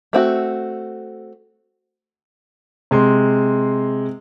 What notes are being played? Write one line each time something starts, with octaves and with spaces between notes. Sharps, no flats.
A3 C4 F#4
C3 G#3 C6